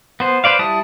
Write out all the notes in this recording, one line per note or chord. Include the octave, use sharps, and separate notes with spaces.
B3 C5
B4 C5 D5 F5
G3 E4 A5 D#6